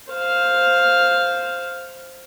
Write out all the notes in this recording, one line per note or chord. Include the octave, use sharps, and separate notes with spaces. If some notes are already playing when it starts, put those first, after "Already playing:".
C5 F5